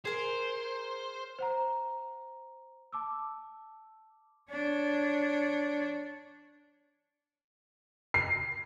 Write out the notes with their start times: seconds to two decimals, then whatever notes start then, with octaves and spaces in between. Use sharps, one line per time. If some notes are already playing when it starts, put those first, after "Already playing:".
0.05 G#4 A#4 C5
1.39 C5 F#5 A#5
2.92 A5 D6 E6
4.50 D4 C#5
8.14 C7